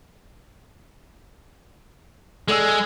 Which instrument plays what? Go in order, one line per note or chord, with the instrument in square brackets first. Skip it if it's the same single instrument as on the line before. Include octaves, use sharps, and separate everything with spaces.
[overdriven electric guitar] G#3 [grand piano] A4 D5 E6